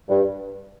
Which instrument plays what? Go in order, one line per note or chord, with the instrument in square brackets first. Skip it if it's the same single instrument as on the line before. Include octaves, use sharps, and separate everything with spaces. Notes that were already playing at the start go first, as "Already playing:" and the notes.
[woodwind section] G2